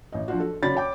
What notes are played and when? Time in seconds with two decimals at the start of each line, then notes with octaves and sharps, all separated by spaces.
0.12 A1 D#5
0.28 F3 F#3 D4 F4 F#4
0.40 A4
0.62 C#3 F#3 C#5 D5 B5 A6
0.75 C#5 G5 D6